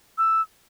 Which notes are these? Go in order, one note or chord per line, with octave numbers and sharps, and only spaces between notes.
E6